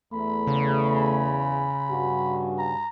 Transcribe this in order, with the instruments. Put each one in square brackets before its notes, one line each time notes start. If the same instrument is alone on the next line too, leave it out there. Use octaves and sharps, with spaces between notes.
[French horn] E2 [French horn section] A3 [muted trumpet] B5
[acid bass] C#3
[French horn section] G2 [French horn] F#4
[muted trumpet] A#5